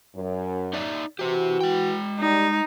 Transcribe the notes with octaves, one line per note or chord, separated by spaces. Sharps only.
F#2
D#4 D5 E5
E3 F#4 G4 C5
G#3 G5
G3 D#4